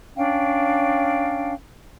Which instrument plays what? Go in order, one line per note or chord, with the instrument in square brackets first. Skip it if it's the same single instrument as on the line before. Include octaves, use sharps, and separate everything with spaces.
[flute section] C#4 D4 F5 G5